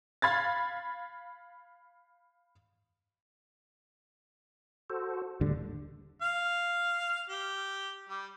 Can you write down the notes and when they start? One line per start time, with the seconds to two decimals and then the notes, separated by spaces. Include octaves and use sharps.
0.22 F5 B5 G#6 A6
4.90 F#4 A4 C5
5.41 D#2 A2 D3 G3
6.22 F5
7.29 G4
8.09 G3